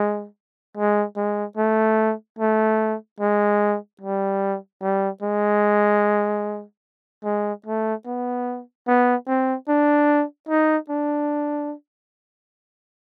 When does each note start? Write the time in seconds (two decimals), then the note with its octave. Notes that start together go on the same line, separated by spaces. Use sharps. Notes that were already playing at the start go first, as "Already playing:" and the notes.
Already playing: G#3
0.77 G#3
1.17 G#3
1.57 A3
2.39 A3
3.20 G#3
4.01 G3
4.81 G3
5.22 G#3
7.24 G#3
7.66 A3
8.06 B3
8.87 B3
9.27 C4
9.68 D4
10.49 D#4
10.89 D4